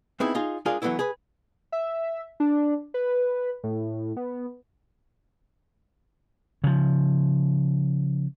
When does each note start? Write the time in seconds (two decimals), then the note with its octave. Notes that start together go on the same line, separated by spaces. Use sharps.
0.20 A3 B3 C4 D#4 E4 G#4
0.35 D#4 F4 G#4
0.65 G#3 D4 F4 G#4 A#4 F5
0.82 E3 F#3 G#3 A3 B3 E4
0.99 G#4 B4
1.72 E5
2.40 D4
2.94 B4
3.64 A2
4.17 B3
6.64 C#3 F3